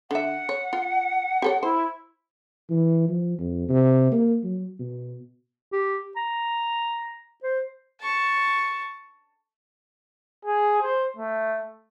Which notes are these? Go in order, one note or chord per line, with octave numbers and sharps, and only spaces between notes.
D3 E5 F#5
C#5
F4
G4 A4 C#5
E4 C5
E3
F3
F2
C3
A#3
F#3
B2
G4
A#5
C5
A5 C#6
G#4
C5
A3